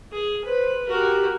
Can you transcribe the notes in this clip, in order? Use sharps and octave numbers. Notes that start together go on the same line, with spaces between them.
G#4
B4 C5
F#4 G4 A#4